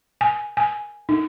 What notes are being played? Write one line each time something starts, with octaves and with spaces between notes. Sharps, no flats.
G#5
G#5
D#4